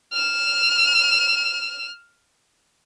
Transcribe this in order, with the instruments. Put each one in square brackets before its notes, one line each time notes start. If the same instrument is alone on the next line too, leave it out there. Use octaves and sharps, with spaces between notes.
[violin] F6 E7